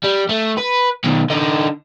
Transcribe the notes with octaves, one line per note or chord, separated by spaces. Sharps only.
G3
A3
B4
B2 D#3
D3 D#4